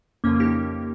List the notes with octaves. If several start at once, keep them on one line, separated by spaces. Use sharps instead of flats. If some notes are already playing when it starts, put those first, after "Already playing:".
F2 C#3 F3 A#3 C#4
D#4 G4